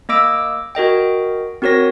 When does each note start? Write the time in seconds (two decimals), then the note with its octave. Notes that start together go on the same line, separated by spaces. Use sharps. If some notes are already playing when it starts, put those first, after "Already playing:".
0.09 A#3 D#5 D6 E6 D7
0.75 F#4 A#4 D#5 G5
1.62 C4 F#4 A#4 C#5 A#6